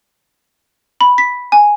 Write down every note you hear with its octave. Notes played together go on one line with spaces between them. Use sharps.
B5
B6
G#5